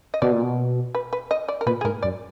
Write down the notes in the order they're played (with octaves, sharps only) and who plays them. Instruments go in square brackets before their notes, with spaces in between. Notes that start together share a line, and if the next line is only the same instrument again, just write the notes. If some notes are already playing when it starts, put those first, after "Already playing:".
[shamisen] D#5
[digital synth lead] B2 [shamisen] D5
[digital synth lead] A#2
B2
[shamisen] B4
B4
D#5
D5
A#4
[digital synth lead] A#2 [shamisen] B4
[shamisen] G#4
[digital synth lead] G#2 [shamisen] A#4
[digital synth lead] F#2 [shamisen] D5